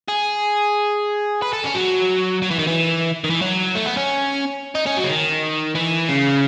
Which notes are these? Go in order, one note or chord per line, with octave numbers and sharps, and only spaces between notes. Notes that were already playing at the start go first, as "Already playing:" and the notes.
G#4
B4
A4
C#4
F#3
F#3
E3
D#3
E3
D#3
E3
F#3
A3
B3
C#4
D#4
C#4
F#3
C#3
D#3
E3
C#3